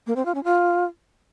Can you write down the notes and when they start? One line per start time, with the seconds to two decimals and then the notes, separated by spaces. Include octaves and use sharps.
0.07 A#3
0.16 C4
0.25 F4
0.35 C#4
0.44 F4